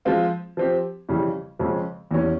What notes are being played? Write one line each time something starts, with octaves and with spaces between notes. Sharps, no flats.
F3 G#3 C4 F4
F3 C4 G4
F2 C#3 E3 G3
F2 C#3 F3 G#3
E2 E3 G3 C#4